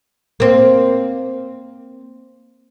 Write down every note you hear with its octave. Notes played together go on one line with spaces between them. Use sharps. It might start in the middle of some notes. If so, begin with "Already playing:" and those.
A#3 C4